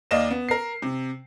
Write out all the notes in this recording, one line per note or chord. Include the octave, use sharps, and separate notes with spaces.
D#2 D5 D#5 F5 E7
B3
A#4 C7
C3